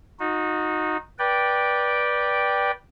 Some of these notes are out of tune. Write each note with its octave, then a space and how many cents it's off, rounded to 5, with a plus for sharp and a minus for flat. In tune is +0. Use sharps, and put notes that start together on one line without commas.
D#4 +0 F#4 -30
B4 -20 D5 +0 G5 +0